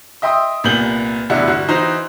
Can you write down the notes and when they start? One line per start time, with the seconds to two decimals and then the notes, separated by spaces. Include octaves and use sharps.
0.22 D#5 E5 G5 C6 D#6
0.64 C2 A#2 B3 G6 F#7 G7
1.30 F1 E2 D4 E4 F#5
1.48 G1 F#4
1.68 E3 D#4 F#4 C5 A#5 F#6